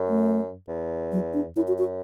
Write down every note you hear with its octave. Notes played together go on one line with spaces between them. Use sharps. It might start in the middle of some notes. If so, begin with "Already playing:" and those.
Already playing: F#2
A3
E2
F#3
D4
F#2 E4
F#4
F#4